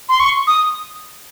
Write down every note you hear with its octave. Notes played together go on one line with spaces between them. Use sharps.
C6
C#6
D#6